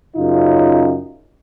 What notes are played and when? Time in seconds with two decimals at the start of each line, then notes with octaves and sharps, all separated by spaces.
0.16 F#2 C#3 D#4 F4